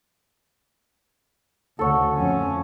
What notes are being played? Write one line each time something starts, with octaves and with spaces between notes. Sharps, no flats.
D2 C#3 A4 C#5 F#5
F2 C#4